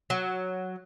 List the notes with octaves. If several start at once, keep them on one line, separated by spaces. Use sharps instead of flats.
F#3